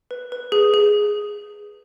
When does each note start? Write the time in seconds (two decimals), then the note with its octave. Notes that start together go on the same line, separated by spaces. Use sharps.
0.11 B4
0.32 B4
0.52 G#4
0.74 G#4